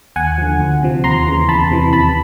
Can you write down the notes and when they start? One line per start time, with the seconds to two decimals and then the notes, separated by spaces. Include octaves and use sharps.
0.16 D#2 F#5 G#5
0.38 D3 F3
0.60 D2
0.83 C3 F3
1.04 D#2 A#5 C6
1.26 C#3 E3
1.49 E2 A5 B5
1.71 C3 E3
1.93 D#2 A5 B5